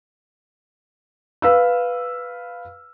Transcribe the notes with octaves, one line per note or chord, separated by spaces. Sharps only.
B4 F5 E6